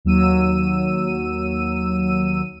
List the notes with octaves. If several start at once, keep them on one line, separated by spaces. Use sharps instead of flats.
D#2 F#3 E6 D#7